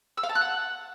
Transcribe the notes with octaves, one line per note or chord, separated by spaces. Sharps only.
E6
F5
A5
F#6
F#5